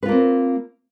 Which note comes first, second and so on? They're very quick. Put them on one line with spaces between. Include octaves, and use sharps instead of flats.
B4 F4 A#3 C4